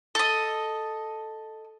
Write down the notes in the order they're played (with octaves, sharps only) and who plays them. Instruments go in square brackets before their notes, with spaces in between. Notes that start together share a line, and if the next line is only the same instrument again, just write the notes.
[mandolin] A4 D#5